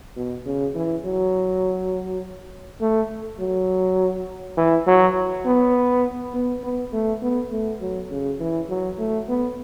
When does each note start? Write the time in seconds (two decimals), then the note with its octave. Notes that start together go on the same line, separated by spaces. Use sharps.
0.16 B2
0.46 C#3
0.75 E3
1.05 F#3
2.81 A3
3.39 F#3
4.57 E3
4.87 F#3
5.46 B3
6.34 B3
6.63 B3
6.93 A3
7.22 B3
7.52 A3
7.81 F#3
8.11 C#3
8.40 E3
8.69 F#3
8.99 A3
9.29 B3